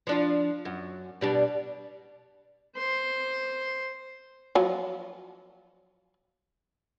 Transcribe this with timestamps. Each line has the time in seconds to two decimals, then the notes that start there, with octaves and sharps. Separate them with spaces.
0.07 F3 D4 F4
0.65 F#2
1.21 B2 G3 D4
2.76 C5 C6
4.55 F3 F#3